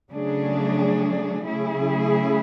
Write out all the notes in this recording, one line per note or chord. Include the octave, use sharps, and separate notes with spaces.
C#3 F#3 A3 D4 G#4
C#3 F#3 A3 E4 G#4